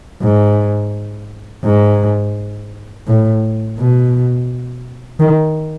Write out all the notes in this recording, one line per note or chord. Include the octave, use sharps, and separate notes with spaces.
G#2
G#2
A2
B2
D#3